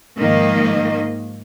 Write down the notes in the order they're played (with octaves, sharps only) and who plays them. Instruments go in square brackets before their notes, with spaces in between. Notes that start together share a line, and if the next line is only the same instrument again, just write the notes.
[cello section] G#2 D#3 F3 A#3 D#5